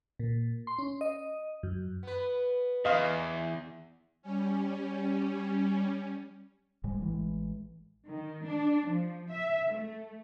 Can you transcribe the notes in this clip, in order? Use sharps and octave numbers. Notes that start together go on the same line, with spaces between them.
A#2
C6
C#4
D#5
F#2
B3 B4
E2 D#5 F5
G3 C#4
E1 G#2 G3 G#3
A1 E3 G#3
D#3
D4
F3
E5
A3